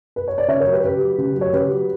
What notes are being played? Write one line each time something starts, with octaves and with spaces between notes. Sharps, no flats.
B4
C#5
D5
C#3 C#5 E5
A#4 C#5
F#3
G4 B4
C#3 G4 B4
F#3
C#3
F#3
C#5
C#3 G4 B4
F#3